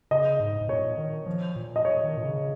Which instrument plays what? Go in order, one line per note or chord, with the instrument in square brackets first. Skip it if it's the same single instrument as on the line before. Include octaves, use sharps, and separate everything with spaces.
[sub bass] C#3 [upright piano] D#5
[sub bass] G#2
G#2
[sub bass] A#2 [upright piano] C#5
[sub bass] D#3
F3
A#2
[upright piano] D#5
C#5
[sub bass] D#3
A#2
C#3